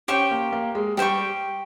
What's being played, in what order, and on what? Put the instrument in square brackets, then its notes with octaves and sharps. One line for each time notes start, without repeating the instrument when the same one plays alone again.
[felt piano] C#4 [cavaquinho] G4 C5 G5 C#6
[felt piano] A#3
A#3
G#3
[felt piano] G3 [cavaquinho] G4 C5 G5 C#6